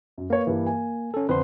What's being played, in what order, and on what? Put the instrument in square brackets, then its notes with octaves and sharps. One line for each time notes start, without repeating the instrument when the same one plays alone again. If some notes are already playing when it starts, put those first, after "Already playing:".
[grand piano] F#2
[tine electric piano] A#3 [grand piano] B4 C#5
[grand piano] G2 E3
G#5
[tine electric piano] C#4 A4
[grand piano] F2 D3 [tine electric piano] B4 C5 C6